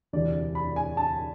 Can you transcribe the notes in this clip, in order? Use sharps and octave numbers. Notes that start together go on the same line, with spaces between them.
E1 D2 C3 E3 D5
B5
G#5
A5